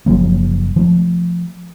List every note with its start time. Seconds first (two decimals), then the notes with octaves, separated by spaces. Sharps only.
0.06 F#1 F3 F#3 A#3
0.76 F3 A3